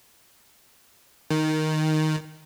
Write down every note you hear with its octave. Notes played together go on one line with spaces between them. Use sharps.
D#3